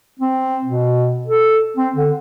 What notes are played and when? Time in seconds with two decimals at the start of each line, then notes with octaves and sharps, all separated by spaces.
0.20 C4
0.65 B2
1.26 A4
1.77 C4
1.96 D3